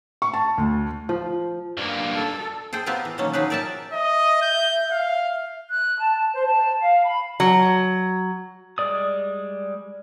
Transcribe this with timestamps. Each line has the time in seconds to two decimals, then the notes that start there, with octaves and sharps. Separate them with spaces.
0.22 C#6
0.34 A5
0.58 D2
1.09 F3
1.77 G2 A#3
2.15 A4
2.73 G#4 A4 C5 G5
2.86 B3 C4 F4 G4 D#5 A#5
3.05 E3
3.18 B2 D#3 F#3 A#3 C#4
3.33 F3 F#3 D#4 G#4 B4
3.50 A#4 D5 E5 G5 A5
3.92 D#5 E5
4.42 G6
4.91 F5
5.69 F#6
5.99 A5
6.34 C5
6.47 A5
6.81 F5
7.05 B5
7.40 F#3
8.78 G3 G#3 D5 D#6